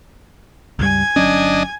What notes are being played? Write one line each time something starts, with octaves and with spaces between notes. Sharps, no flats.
C#2 G2 G3 G#5 G#6
G1 F#3 C#4 D4 D#5